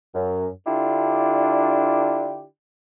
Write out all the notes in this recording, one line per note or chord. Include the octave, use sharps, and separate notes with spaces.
F#2
D3 D4 E4 F4 G4 D5